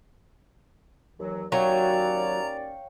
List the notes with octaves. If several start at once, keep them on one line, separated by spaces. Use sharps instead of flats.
D#2 E3 F#3
D#2 F#3 C#4 C#5 D5 F5 G5 A#5